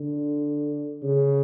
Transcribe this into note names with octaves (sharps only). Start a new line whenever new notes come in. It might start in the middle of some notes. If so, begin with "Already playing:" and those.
Already playing: D3
C#3